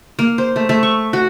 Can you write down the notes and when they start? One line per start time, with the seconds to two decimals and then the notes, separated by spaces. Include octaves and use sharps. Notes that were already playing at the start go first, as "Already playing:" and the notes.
0.19 A#3
0.38 C5
0.56 A3
0.69 A3
0.83 C#6
1.13 F#4